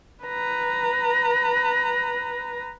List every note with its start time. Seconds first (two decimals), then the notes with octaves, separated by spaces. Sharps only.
0.23 B4 A#5